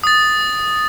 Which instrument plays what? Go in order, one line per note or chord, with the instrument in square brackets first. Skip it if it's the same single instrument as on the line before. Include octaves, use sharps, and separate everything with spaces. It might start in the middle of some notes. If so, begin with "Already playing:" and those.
[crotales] D#6 A6